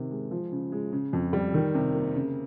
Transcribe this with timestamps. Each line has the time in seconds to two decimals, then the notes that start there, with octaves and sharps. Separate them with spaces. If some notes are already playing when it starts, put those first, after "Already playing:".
Already playing: C3 D#3
0.11 G#3
0.31 F3
0.52 C#3
0.72 G#3
0.92 C#3
1.13 F2
1.33 G3
1.54 D#3
1.75 C3
1.94 A#3
2.15 C#3